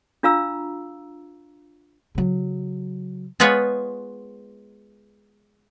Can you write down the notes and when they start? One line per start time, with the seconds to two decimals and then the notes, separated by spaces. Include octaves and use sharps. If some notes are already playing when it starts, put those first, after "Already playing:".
0.23 D4 F4 F5 A#5 E6
2.15 C#3 F#3
3.40 G#3 B3 F4 B4 C#5